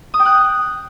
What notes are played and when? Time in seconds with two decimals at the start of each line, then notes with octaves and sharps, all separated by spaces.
0.14 D#6
0.20 G5
0.25 F#6